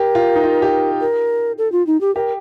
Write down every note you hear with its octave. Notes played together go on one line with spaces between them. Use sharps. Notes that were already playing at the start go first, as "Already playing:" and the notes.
Already playing: G4 A#4
F4
D#4
F4
G4
A#4
A4
F4
D#4
G4
G4 A#4